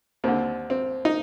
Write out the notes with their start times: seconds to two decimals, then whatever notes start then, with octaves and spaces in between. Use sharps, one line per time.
0.24 D#2 D3 C4
0.70 C4
1.05 D#4